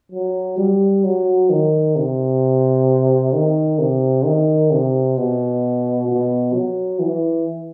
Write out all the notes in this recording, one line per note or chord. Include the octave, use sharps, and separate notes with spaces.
F#3
G3
F#3
D#3
C3
D#3
C3
D#3
C3
B2
B2
F#3
E3